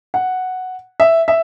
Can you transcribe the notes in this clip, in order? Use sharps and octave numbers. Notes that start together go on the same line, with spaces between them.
F#5
E5
E5